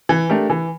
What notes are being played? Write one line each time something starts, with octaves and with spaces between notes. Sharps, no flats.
E3
A3 D4 G4 A#4
E3